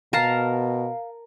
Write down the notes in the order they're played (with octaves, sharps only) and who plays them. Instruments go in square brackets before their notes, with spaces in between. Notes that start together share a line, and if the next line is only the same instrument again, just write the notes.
[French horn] B2 [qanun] A#4 A5 A#5 [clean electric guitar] F5